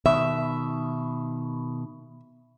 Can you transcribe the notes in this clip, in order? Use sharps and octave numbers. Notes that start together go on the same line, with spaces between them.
B2 D#3 E5